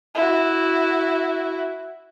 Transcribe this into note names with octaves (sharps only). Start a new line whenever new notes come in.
E4 F#4